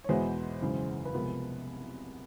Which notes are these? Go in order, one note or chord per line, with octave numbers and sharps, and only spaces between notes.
C#5
E2 B2 G#3 B3 E4 C5
F#2 C#3 E3 G#3
B4
C2 C3 F3 G#3 B3 A#4